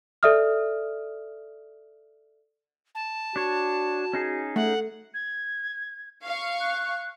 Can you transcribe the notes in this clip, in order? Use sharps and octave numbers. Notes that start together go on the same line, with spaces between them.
A4 D5 E5 D#6 F6
A5
D4 F#4 C#5
C#4 D#4 G#4
A3 F#5
G#6
F5 C#6
F#6